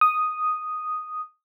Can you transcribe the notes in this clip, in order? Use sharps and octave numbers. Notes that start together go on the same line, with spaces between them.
D#6